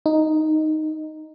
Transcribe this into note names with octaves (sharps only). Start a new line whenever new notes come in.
D#4